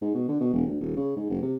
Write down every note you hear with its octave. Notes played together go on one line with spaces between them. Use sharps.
G#2
B2
D3
B2
E1
D2
D#1
C#3
G#2
F#1
C3